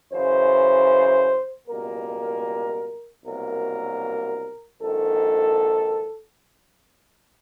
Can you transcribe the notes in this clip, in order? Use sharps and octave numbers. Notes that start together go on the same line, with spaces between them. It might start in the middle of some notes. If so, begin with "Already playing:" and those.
F#2 C#3 E3 C5
C#2 B2 G3 A#3 A#4
C2 B2 F#3 A#3 A#4
A#1 G#2 D#3 A4